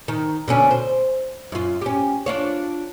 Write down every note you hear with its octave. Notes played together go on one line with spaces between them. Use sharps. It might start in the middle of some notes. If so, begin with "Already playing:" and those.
D#3
B2 D3 C#4
C5
F#2 F4
C#4 G4
D4 F4 C#5